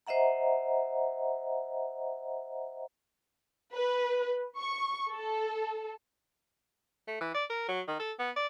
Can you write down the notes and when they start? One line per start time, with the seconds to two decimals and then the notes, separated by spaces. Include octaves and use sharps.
0.07 C5 D#5 E5 F#5 A#5
3.73 B4
4.56 C#6
5.10 A4
7.08 A3
7.21 E3
7.34 D5
7.50 A#4
7.68 F#3
7.88 D#3
7.99 A4
8.19 B3
8.36 D5